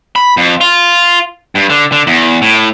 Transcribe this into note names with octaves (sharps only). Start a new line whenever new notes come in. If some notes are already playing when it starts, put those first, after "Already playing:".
B5
F2
F4
G2
D3
D3
E2
A2